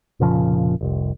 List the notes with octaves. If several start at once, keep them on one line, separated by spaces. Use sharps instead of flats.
F1 A#2 C#3 F3
F1 C2